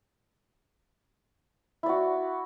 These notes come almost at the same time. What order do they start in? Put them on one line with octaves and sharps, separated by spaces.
E4 D5 F#4